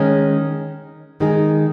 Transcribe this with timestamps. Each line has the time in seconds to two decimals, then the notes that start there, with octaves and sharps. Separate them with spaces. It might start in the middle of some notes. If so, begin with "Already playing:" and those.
Already playing: D#3 G#3 C#4
1.20 D#3 G#3 D#4 G#4